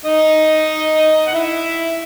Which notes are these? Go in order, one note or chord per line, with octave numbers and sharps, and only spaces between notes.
D#4 D#5
F#5
E4 E5